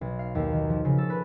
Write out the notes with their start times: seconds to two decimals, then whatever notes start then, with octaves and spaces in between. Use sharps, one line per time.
0.01 B1
0.19 F5
0.35 D#2
0.53 D#3
0.70 F3
0.85 C#3
0.98 A4
1.10 B4